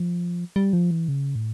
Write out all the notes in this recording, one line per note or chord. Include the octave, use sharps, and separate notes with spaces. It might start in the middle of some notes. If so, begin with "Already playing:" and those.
Already playing: F3
G3
F3
E3
C#3
A2